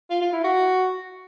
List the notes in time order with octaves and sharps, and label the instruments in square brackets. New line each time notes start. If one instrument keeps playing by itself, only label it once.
[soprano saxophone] F4
F4
E4
F#4